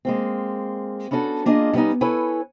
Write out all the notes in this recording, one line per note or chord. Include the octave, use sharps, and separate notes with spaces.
G#3 A#3 C4
B3 C#4 D4 F#4 A4
A#3 D4 F4 G#4 D#5
A2 G3 B3 C#4 D#4
E4 A4 B4 C#5 G#5